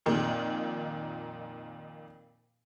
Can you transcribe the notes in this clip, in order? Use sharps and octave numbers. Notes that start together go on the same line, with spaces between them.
F2 A#2 D#3